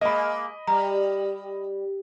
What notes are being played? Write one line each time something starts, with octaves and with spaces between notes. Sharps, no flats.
G#3 A#3 D#5 B5
G3 A#5